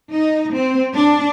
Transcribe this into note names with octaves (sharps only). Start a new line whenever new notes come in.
D#4
C4
D4